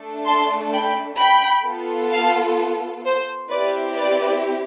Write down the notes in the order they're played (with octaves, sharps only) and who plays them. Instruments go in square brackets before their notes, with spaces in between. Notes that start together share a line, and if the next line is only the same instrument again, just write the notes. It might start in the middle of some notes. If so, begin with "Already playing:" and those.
Already playing: [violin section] A3 D4 A4
A5 C6
G5 B5
G5 B5
B3 F4 A4
F5 A5
C5
C4 E4 G4 B4 D5
B4 D5